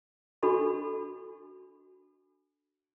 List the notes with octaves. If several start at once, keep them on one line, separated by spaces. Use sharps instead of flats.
D4 F#4 A4 B5 C#6